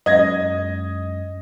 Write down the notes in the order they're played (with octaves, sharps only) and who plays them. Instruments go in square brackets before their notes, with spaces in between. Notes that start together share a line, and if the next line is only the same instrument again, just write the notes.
[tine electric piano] F#2 G#3 [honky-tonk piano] D#5 G#6 A#6